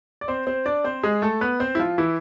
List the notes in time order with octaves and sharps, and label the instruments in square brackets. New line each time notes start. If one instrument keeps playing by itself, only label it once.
[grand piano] D5
C4 C5
C4 C5
D4 D5
C4 C5
G#3 G#4
A3 A4
B3 B4
C4 C5
E4
F3 F4
E3 E4